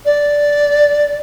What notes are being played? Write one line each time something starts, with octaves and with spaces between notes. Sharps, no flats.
D5